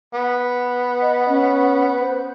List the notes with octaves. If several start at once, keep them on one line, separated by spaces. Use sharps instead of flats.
B3
D#5
C#4
C5